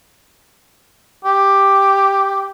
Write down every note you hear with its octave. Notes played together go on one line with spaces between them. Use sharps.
G4